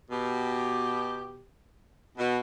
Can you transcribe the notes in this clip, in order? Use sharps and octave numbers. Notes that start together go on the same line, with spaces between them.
B2 G4
B2